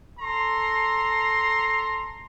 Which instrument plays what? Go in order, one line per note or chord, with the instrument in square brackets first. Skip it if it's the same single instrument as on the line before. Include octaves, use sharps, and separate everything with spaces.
[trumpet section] A4 A#5 C6